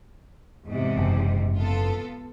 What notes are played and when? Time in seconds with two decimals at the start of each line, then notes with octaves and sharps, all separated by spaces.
0.65 E2 G#2 C3
0.98 F#1
1.55 B3 F4 A4